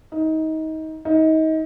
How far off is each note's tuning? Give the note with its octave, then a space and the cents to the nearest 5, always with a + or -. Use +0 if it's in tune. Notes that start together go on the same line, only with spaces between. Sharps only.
D#4 +25
D#4 +30